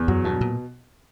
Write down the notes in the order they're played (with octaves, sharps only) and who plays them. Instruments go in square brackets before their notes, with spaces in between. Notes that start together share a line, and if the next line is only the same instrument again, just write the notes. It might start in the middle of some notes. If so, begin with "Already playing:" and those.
Already playing: [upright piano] E2
[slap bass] F#2 [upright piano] F#3
[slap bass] G2 [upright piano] B2
[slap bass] A#2